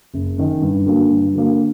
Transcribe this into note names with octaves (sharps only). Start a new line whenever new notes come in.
F#1
F#2 D#3
G2
D3 F#3 A#3
G2
D3 F#3 A#3